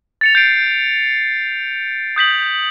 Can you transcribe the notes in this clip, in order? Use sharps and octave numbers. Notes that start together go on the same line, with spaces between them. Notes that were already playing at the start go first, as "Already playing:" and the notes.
A6 C#7 F7
G6 A6 C7 D7
D#6 G6 B6 F#7